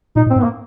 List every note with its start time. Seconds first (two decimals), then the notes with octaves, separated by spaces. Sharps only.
0.16 A#2 D#4
0.26 A2
0.30 C4
0.36 G#2
0.39 B3
0.43 A#3